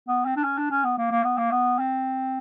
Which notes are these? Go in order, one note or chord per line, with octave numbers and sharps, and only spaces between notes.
B3
C4
D4
C#4
D4
C#4
B3
A#3
A#3
B3
A#3
B3
C4